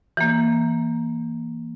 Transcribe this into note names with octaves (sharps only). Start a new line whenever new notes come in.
E3 A#3